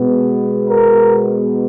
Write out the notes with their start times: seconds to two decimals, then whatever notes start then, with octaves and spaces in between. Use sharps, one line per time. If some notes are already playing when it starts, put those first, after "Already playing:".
Already playing: B2 G#3 B3
0.67 A#4